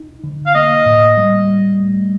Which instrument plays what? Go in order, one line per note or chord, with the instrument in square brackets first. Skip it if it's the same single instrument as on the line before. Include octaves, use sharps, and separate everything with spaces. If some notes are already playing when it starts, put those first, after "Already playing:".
Already playing: [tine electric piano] D#4
D3
[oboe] F5
[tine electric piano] A#3 [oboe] D#5
[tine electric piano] A2
G3
G3
A3